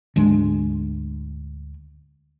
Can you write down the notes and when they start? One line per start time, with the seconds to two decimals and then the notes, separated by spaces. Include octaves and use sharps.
0.16 D2 G#2 G#3 D4